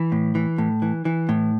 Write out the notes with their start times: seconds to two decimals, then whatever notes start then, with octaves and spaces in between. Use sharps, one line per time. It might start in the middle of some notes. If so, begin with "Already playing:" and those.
Already playing: E3
0.12 A2
0.35 E3
0.58 A2
0.82 E3
1.05 E3
1.29 A2